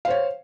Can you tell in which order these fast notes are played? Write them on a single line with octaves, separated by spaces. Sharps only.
F5 C5 C#5